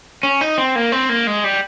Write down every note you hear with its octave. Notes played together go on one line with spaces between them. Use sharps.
C#4
D#4
C4
A#3
C4
A#3
G#3
G3